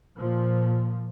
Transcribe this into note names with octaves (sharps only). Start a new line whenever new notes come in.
A#2 F3